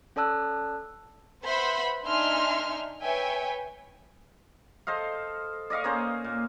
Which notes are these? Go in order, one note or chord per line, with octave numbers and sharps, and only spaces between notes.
C#4 A4 D5 A5 E6 F#6
B4 C5 E5 F#5 B5 C6
D4 D#4 E5 G#5 C6 F6
B4 C#5 E5 G5 G#5
A4 C5 D#5 F5
D5 D#5 F5 C#6
A#3 C#4 C5
A#2